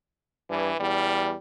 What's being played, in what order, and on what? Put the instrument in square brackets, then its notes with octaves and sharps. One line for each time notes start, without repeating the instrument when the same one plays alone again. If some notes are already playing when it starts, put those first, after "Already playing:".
[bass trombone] G2 [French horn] E3
[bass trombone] E2 [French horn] G3